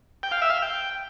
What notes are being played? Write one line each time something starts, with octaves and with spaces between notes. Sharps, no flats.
G5
F5
E5
F5
G5